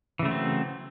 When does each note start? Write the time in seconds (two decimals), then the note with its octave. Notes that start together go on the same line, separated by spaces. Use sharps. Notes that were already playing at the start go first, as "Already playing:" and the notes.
0.19 E3
0.22 C#3
0.25 A3
0.28 F#3
0.31 C4